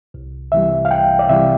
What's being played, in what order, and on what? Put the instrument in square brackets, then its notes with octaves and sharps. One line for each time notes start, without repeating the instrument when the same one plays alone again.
[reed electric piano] C2
C3 E3 G3 E5
F5
C2 G5
D5
C3 E3 G3 E5